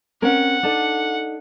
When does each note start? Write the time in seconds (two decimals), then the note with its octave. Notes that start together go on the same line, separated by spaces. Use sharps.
0.22 C4 C#4 A#4 F#5
0.63 D4 D#4 A4